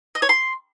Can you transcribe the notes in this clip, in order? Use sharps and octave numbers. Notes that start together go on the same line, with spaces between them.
D#5
C#5
C6